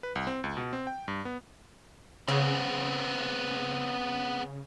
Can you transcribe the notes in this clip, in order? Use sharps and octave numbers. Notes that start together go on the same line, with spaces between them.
B4
C2
C4
C#2
B2
C4
G5
G2
B3
C#3 B3 C4